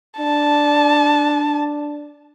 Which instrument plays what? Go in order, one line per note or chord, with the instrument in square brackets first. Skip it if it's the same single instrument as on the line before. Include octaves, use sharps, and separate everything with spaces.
[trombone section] D4 [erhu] A5